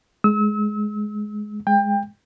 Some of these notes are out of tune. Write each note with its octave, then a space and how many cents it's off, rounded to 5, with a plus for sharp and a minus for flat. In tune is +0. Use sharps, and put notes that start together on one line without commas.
G#3 +15 E6 -40
G#3 +0 G5 +25